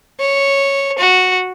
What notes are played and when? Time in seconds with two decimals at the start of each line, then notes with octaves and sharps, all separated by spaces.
0.19 C#5
0.99 F#4